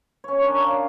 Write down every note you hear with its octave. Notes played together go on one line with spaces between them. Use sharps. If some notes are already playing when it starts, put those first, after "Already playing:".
C#4 C#5
D4 A#4
F5